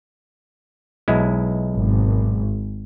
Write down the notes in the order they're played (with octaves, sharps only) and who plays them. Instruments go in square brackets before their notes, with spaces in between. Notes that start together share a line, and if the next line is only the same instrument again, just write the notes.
[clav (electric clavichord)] B1 G#3 E4
[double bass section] G#1